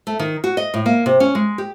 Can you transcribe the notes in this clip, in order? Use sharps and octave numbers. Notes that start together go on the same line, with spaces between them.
A3
D#3
F#4
D#5
A2
A#3
C3
C#4
G#3
G4